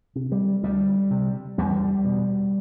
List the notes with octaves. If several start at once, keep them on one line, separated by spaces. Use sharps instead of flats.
C3
G3
D2 G3
C3
E2 G3
B2